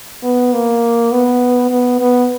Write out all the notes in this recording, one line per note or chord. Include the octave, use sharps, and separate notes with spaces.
B3
A#3
B3
B3
B3